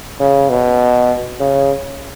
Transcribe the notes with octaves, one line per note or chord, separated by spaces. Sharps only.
C#3
B2
C#3